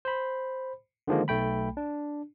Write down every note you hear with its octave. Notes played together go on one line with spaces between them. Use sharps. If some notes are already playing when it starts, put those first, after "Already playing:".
C5 B5
D3 D#3 F3 G#3 A#3
B1 A3 G5 B5
D4